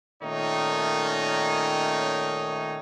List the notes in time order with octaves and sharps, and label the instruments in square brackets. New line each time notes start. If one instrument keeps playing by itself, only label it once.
[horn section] A#2 D#3 A3 C#4 D#4 C#5